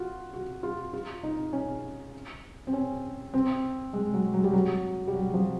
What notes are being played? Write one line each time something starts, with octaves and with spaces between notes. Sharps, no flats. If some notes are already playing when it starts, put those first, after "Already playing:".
Already playing: F4 F#4
F#4
F4
F4
D#4
C#4
C4
C#4
C4
G#3
F#3
F#3
G3
F#3
G3
F#3
F3